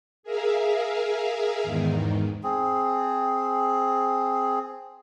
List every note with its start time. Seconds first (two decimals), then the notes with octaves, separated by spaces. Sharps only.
0.23 G#4 A#4 E5 F5
1.63 E2 G#2 D#3
2.43 C4 G#4